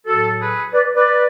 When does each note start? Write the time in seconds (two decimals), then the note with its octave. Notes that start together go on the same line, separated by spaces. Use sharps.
0.06 A2 F#3 F#4 A4
0.40 G#4 B4
0.72 B4 D5
0.96 B4 D5